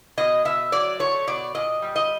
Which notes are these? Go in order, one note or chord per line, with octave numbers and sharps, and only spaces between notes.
B2 D#5
B2 E5
F#3 D5
A3 C#5
B2 D5
A#2 D#5
G3
D#5